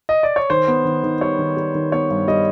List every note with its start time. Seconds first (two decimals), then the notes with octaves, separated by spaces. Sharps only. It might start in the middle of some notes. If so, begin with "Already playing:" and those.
0.09 D#5
0.23 D5
0.36 C#5
0.50 D#3 C5
0.68 B3
0.85 D#3
1.03 D#3
1.21 G3 C#5
1.39 D#3
1.57 G3
1.75 D#3
1.92 B3 C#5
2.10 G2
2.27 G3 D#5